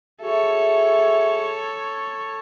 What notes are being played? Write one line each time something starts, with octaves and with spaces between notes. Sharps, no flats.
F#4 G#4 A4 C#5 E5